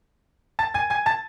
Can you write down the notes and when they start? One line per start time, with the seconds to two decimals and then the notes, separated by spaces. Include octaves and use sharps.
0.59 A5 A6
0.74 G#5 G#6
0.90 G#5 G#6
1.06 A5 A6